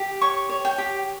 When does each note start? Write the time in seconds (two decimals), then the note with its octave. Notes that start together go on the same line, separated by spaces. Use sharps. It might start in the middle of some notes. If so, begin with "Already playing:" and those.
Already playing: G4
0.21 C#5 C#6
0.49 C#5
0.65 G5
0.78 G4